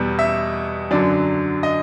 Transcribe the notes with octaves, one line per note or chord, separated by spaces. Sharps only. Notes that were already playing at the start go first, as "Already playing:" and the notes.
Already playing: E2 B2 G3 B3
E5
F#2 D3 F#3 D5
D#5